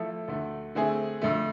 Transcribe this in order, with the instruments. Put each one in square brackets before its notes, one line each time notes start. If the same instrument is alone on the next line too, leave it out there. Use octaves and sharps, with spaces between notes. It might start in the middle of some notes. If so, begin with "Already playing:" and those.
Already playing: [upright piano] F3 A3 E4 A4
D2 D3 A3
D3 A3 C4 G#4
F2 D3 A3